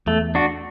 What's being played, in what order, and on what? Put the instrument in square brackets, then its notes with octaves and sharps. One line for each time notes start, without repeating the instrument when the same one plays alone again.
[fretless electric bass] E2 [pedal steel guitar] A3
[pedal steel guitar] D4 F#4